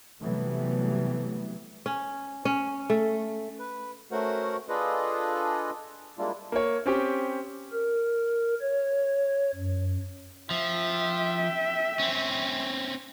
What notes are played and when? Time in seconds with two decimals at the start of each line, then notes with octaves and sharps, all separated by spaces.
0.21 C3 E3 F#3 G3 A3 B3
1.86 C#4
2.45 C#4
2.90 A3
3.59 B4
4.12 A3 C#4 F#4 A#4 C5 F#5
4.69 D4 F4 G#4 A4 B4 D#5
6.18 G3 G#3 A#3 D4 E4 F4
6.52 A#3 C#5
6.86 C4 C#4 G4
7.72 A#4
8.61 C#5
9.55 F#2
10.50 F3 E5 G5
11.99 C4 C#4